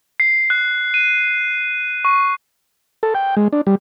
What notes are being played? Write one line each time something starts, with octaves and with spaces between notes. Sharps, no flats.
C7
F#6
D#7
C#6
A4
G5
G#3
D4
G3